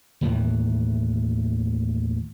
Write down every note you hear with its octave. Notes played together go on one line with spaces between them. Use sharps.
D#2 A2 D#3 E3